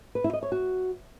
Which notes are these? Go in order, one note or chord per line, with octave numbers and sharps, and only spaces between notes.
B4
E4
D#5
C#5
F#4